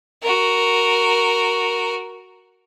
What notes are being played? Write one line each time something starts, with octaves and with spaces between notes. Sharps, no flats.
F#4 A#4